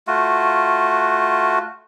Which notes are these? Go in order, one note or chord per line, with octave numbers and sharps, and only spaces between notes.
A3 F4 F#4